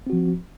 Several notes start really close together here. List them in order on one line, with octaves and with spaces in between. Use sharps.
C4 F#4 F3